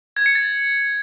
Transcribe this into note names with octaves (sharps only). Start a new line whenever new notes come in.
G#6
C#7
A6